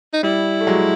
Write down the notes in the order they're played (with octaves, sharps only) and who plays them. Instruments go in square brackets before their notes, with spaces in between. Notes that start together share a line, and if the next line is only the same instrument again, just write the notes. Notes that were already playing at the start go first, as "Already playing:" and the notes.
[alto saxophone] D#4
[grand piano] G3 [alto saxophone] E4
[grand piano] A3
F#3 G#3